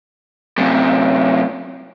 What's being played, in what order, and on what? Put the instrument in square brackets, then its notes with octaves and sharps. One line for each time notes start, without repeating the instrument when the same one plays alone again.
[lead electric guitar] F#2 C3